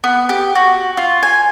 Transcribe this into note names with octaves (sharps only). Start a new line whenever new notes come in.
B3
G4
F#4
F4
G#5